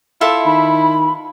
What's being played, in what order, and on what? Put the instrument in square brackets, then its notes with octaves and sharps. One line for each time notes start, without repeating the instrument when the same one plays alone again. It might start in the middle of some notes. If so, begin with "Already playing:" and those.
[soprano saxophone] E4 [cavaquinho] F4 A4 E5
[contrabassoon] D#3 [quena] B5